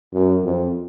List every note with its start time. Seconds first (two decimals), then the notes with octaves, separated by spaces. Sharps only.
0.13 F#2
0.44 F2